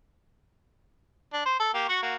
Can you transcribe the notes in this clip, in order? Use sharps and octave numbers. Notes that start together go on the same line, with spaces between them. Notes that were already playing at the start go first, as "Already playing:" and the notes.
D4
C5
A4
A#3 G4
F#4 F#5 C#6
A#3 F#4